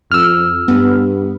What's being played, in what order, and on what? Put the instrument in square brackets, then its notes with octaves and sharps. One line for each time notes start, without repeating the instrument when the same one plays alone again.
[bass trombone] F2 [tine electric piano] E6 F6
[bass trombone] G2 [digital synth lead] B3